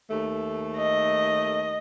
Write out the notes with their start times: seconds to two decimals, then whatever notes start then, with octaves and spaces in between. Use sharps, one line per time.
0.10 D#2 A3
0.77 D#5